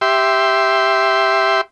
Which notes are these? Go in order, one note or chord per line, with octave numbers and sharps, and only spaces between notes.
G4 E5 C6